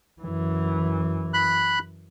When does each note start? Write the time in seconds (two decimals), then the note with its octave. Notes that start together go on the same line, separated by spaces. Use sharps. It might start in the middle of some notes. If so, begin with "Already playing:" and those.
0.22 F#2 E3
1.34 B5 F#6